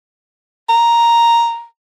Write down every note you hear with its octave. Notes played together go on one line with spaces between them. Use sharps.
A#5